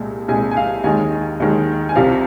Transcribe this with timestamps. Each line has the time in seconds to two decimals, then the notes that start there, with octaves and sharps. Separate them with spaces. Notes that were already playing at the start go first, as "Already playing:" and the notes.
Already playing: C2 A#2 G#3
0.28 C2 A#2 G#3 G#5
0.51 G#5
0.57 F5
0.84 D#2 D#3 G#3 G#5
1.40 D#2 D#3 G#3
1.89 G#5
1.95 C2 C3 F3 F5